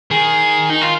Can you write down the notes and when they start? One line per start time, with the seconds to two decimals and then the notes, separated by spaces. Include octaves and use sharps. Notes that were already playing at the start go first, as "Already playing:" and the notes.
0.11 D#3 G#4
0.70 D#4
0.81 F4